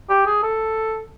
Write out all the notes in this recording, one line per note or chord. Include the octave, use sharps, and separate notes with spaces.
G4
G#4
A4